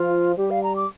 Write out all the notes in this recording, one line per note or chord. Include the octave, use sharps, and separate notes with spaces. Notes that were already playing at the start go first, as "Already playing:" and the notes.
Already playing: F3 F4
G3 G4
F5
A#5
D6